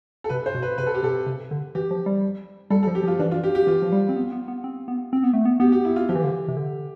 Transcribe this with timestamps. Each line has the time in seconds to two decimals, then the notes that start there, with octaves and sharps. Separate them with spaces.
0.24 A4
0.29 C3 B4
0.46 C5
0.55 B2
0.62 B4
0.78 C3 B4
0.87 A4
0.95 G4
1.03 B2 A4
1.26 C3
1.51 D3
1.75 E3 G4
1.91 F3
2.06 G3
2.70 G3 A4
2.83 A4
2.88 F3
2.95 G4
3.04 F3
3.08 F4
3.19 E3 D4
3.31 F4
3.44 G4
3.55 G4
3.67 E3 F4
3.82 F3
3.92 G3
4.09 C4
4.16 B3
4.32 B3
4.48 B3
4.64 C4
4.88 B3
5.13 C4
5.24 B3
5.33 A3
5.45 B3
5.60 B3 G4
5.72 G4
5.85 E4
5.96 F4
6.09 F3 G4
6.15 E3
6.23 D3
6.31 E3
6.48 C3
6.57 D3